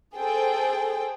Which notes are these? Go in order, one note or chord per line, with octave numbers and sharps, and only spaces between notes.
G#4 A4 C5 G5